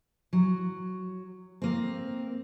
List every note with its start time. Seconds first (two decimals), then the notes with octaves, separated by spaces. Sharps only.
0.33 F#3
1.62 A#3 C4